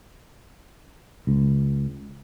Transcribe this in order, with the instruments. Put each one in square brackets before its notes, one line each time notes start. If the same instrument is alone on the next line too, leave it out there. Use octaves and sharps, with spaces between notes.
[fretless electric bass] C#2